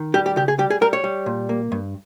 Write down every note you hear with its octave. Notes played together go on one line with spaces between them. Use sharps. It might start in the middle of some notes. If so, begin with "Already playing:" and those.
Already playing: D#3
G3 G4
G4
C#3 G4
G#4
G3 G4
G#4
G3 A#4
C#5
G3
A#2
A#3
G2